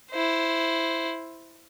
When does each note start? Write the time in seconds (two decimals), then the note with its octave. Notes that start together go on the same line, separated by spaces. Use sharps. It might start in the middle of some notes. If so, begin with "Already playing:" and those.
0.11 E4 C5